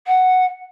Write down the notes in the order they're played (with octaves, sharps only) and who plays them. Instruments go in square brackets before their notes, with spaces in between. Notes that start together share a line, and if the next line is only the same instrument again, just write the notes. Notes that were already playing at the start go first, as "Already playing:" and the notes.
[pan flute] F#5